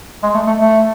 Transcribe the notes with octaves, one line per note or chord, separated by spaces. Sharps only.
G#3
A3
A3
A3